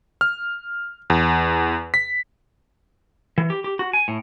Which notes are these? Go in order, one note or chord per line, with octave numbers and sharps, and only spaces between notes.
F6
E2
B6
E3
G4
G4
F#4
G#5
A2